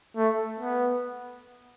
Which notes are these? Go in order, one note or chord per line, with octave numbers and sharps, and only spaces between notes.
A3
B3